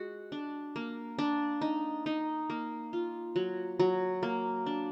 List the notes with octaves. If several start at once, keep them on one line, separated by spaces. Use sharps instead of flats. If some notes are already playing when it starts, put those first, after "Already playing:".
Already playing: G#3 F#4
D4
A#3
D4
D#4
D#4
A#3
F4
F#3
F#3
A#3
D4